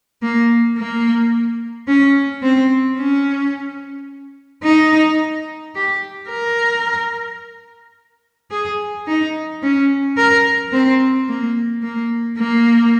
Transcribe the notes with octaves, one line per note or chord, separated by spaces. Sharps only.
A#3
A#3
C#4
C4
C#4
D#4
G4
A#4
G#4
D#4
C#4
A#4
C4
A#3
A#3
A#3